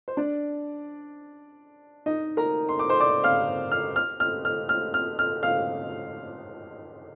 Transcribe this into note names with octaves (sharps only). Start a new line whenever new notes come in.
C5
D4 D5
D#4 D#5
A#4 A#5
C6
D6
C5 C6
D5 D6
F5 F6
F6
F6
F6
F6
F6
F6
F6
F5 F6